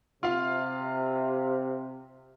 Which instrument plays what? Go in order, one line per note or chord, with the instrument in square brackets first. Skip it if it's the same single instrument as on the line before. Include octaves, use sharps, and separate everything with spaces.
[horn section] C3 [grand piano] F4 F5